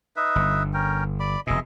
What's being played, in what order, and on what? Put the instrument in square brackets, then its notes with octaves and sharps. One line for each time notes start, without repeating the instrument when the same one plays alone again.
[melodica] D#4 B4 E5
[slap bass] G1
[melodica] C#4 A#4 G5
D5 B5 D6
[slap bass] F1 B2 [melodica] G#4 D#5 E5